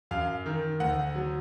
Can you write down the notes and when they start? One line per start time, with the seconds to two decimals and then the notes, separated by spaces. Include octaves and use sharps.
0.11 F#2 F5
0.46 D#3
0.80 D2 F#5
1.15 F#3